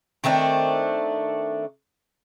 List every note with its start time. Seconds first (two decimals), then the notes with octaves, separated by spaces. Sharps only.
0.24 D#3 A3 C4 D4